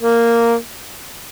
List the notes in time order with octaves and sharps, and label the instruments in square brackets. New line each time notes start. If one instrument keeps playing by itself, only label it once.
[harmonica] A#3